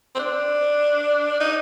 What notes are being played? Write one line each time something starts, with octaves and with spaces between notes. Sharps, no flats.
C4
D4
D#4